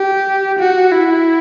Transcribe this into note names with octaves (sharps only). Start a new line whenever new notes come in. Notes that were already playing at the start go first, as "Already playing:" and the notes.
Already playing: G4
F#4
E4